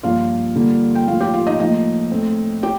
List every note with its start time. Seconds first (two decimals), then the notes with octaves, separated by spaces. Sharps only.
0.03 G2 F3 A#3 F4 F5
0.56 D3 G3 A#3
0.95 G5
1.07 A2 F3 A#3 F4 F5
1.21 G4 G5
1.34 F4 F5
1.47 D#4 D#5
1.59 A2 F3 A#3 D#4 D#5
2.11 A2 A3 C4
2.63 G4 G5